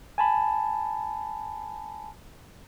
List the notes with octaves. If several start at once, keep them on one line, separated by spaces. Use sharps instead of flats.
G#5 A5 B5